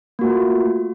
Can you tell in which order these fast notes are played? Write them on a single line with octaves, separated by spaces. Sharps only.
A#3 F#4 A3 F4